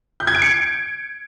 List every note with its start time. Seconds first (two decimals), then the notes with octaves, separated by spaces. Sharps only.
0.20 G6
0.27 G#6
0.35 D7
0.42 C#7